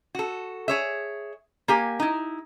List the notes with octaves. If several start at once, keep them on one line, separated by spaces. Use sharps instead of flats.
F#4 A4
G#4 C#5 E5
A#3 G4 G#5
D#4 E4